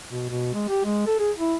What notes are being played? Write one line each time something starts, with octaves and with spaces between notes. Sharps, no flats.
B2
B2
G#3
G4
G#3
A4
G#4
E4